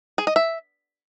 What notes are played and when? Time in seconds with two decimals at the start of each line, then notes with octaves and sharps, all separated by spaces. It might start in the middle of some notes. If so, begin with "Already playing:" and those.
0.18 G#4
0.27 D#5
0.36 E5